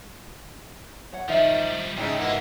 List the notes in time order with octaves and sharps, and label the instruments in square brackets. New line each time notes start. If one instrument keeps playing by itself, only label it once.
[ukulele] C#5 F#5
[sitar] D#3 [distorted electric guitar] F3 G3 [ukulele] D#4 C5 E5
[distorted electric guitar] G#2 A4 [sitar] C#3 D#4 E4 [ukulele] G5
[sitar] B2 A#3 E4 [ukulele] A#4 F#5